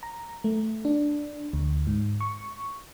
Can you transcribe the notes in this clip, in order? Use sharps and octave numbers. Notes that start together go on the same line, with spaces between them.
A#5
A3
D4
D2
G#2
C#6